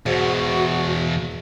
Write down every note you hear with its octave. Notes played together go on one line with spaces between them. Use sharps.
E2 G#2 B2 F#4